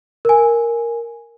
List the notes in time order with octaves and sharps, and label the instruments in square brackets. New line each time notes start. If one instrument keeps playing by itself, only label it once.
[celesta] A#4 G#5